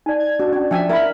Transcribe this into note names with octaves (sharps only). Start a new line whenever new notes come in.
D#4 D5 G#5
G#6
D4 F#4
C#4 D4 D5
F3 D4 E5 G5 G#5
E4 A#4 E5 B5